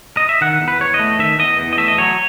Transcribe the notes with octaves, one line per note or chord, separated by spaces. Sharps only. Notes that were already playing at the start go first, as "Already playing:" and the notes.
D#5
E5
D#3 F#5
E2
B4
E2 C#5
D#5
A3
D#3 E5
E2 D#5
E2
D#5
A3 E5
D#5
F#3 C#5